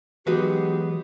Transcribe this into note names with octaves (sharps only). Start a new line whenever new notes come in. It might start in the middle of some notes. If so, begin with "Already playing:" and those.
E3 F#3 G#3 B3 D#4 F#4 G4 B4